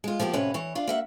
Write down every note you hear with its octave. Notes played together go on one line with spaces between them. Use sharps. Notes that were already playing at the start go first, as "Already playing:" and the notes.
G#3 F4
F3 A#3 B3 G4
F2 A2 C3 C#4 B4
E3 C#5
D4 F4
A#3 E5 F#5